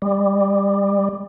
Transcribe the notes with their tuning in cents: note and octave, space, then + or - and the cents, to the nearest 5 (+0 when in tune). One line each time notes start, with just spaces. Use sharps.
G3 +25